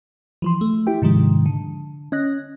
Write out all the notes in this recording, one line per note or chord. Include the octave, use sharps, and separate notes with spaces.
E3 F3 C6
A3
E4 G4 G5
G#2 C3 D#3 F3 G#3
D3
C#4 D#5 F#6 A#6